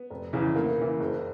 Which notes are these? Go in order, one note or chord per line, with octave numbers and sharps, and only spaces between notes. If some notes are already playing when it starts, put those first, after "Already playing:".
Already playing: B3
F1
E2 C#3 E3
D2 A#3
C#3 E3
F#1